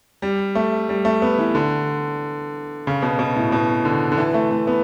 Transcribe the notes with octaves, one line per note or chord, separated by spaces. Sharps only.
G3
A3
G3
A3
B3
E3
D3
C#3
B2
B2
A2
B2
D3
D3
E3
A3
A3
B3